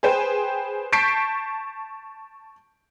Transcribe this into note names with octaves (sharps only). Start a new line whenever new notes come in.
G#4 B4 C5 G5
A5 C#6 G6 B6 C7 D7